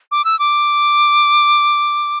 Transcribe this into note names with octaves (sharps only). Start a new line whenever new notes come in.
D6
E6
D6